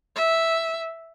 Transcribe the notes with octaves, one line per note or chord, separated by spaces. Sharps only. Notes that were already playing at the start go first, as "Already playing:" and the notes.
E5